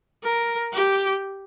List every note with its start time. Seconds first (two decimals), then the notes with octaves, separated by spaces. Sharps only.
0.23 A#4
0.73 G4